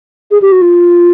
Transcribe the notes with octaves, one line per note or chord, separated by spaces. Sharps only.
G#4
G4
F#4
F4